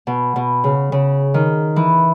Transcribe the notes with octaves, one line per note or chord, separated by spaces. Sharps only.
B2
B2
C#3
C#3
D#3
E3